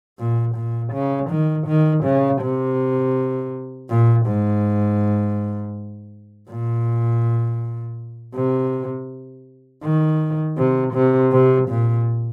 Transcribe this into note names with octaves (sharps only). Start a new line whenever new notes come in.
A#2
A#2
C#3
D#3
D#3
C#3
C3
A#2
G#2
A#2
C3
D#3
C3
C3
C3
A#2